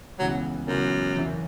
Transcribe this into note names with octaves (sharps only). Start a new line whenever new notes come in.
C#2 C#3 E3 F#3 B3
C#2 F#2 C#3 E3 B3
F#1 E2 E3 C#4 E4